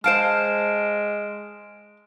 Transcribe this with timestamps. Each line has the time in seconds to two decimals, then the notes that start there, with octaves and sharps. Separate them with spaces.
0.04 G#3 C5 F5 A5 F6 D7 E7